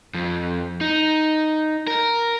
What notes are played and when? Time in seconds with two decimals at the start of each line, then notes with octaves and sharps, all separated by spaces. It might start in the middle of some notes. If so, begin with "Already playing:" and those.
0.14 F2
0.81 D#4
1.87 A#4